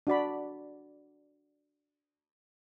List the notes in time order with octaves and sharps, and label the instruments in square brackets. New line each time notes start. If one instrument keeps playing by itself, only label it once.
[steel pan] D4 F#4 D5 B5